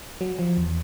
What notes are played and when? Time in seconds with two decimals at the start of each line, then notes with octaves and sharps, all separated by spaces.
0.21 F#3
0.39 F3
0.58 E2